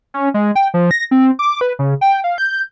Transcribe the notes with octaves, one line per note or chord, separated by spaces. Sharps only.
C#4
G#3
G5
F3
A#6
C4
D6
B4
C#3
G5
F5
G6